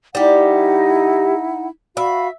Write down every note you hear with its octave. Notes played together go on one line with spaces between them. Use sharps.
G3 D#4 E4 G4 F#5
F#4 E5 F5 B5